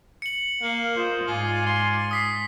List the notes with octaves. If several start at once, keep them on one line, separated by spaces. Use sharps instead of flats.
C#7 F#7
A#3 F5
F4 G#4 C5 D#5
G#2 F4 D5 F5 G#5
C6
D#6 B6 C7